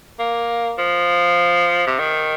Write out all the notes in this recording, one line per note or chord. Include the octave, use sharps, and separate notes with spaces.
A#3
F3
C3
D#3